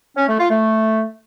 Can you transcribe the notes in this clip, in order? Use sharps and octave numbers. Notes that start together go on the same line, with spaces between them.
C#4
A3
F4
A3